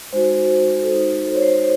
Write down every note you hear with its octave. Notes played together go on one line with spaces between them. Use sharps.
G#3 D#4 F#4 C5
A4
G#3 D#4 F#4 C5
C5
C#5
C5